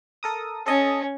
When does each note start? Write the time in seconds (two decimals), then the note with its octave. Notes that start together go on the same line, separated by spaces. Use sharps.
0.23 A4 A#4 D#6
0.66 C#4 A4 D#5 A5